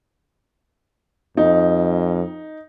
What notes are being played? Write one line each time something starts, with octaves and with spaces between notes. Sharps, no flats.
F2 D#4